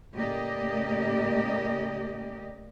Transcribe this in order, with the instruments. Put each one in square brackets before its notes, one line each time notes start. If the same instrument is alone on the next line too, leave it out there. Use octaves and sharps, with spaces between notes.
[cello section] A2 C#3 A#3 G4 D5 D#5